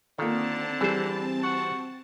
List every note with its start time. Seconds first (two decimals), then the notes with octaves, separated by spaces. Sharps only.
0.18 D3 D#3 A#3 C4 F4 A4 A5
0.81 E3 G3 G#4 C5
1.44 F#4